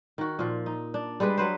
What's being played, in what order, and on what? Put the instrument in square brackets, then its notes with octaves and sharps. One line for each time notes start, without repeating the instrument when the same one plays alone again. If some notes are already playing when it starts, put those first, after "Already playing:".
[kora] D#3 F#4
A#2 F3
D#4
D4
G3 G#3 G#4 B4
F#3 B4 C5